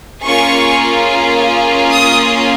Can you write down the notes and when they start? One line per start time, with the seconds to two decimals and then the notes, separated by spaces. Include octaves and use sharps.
0.24 A#3 C#4 F4 G#4 C#6
1.91 D#6